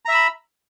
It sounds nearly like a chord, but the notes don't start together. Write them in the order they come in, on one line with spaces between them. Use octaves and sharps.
A#5 E5 E6 B5